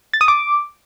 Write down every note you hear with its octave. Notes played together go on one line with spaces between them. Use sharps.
A6
D#6
D6